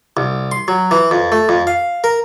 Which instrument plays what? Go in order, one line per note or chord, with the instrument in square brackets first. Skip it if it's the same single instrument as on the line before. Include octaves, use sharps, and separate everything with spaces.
[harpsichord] C2
C6
F#3
E3
F2
A3
F2
F5
A#4